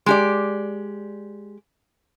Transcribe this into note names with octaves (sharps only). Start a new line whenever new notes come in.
G#3 G4 D5